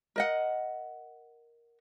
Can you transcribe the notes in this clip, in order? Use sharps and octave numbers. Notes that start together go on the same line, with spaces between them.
A#4 D#5 F#5